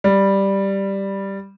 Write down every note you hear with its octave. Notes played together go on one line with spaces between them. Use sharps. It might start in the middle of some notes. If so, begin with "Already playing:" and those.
G3